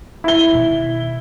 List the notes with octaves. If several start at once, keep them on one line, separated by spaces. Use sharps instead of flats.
E4 G7
B2 D#3